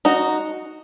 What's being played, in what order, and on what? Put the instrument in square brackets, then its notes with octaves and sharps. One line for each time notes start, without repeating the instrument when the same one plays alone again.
[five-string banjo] D#4 F#4